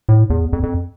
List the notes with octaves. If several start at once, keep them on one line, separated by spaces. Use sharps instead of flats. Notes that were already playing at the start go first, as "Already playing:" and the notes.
A2
E2
F2
F2